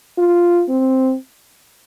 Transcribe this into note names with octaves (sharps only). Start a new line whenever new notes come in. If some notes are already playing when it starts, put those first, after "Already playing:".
F4
C4